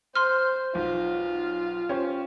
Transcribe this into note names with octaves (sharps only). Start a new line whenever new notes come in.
C5 C6 F6
B1 F4
C#4 G4 C5